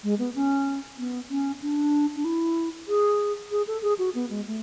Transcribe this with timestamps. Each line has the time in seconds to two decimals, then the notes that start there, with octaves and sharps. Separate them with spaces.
0.03 G#3
0.19 B3
0.35 C#4
0.98 B3
1.30 C#4
1.62 D4
2.16 D4
2.25 E4
2.88 G#4
3.51 G#4
3.67 A4
3.83 G#4
3.99 F#4
4.15 B3
4.30 G#3
4.46 A3